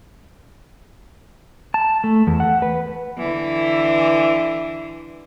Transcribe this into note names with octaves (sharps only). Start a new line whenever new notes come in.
A5
A3
E2
F#5
B4
D3 E3